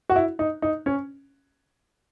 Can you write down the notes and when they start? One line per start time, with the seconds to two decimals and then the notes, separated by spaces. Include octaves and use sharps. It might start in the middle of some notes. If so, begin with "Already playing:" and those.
0.10 F#4
0.16 E4
0.39 D#4
0.62 D#4
0.86 C#4